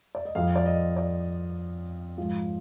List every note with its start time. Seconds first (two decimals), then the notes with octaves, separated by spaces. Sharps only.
0.15 D5
0.25 D#5
0.35 F2 F3 F5
0.56 D5
0.66 D#5
0.97 D5
2.17 G#2 F3